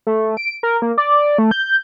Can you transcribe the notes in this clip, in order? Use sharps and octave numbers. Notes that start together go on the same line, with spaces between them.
A3
D7
A#4
A#3
D5
A3
G6